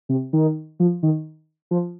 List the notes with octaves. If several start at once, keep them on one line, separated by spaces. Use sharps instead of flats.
C3
D#3
F3
D#3
F3